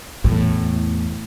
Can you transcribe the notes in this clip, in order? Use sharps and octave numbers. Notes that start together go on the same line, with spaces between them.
E2 A2